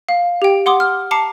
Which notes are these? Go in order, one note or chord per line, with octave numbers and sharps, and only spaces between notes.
F5
G4 G5
F#5 C6 D6 D#6
F6
A5 A#5 D6 C7 C#7